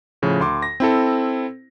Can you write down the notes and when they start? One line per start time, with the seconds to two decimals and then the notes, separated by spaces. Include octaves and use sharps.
0.22 A2 C#3 F3
0.41 D2 C6 D6
0.63 A#6
0.80 C4 E4 A4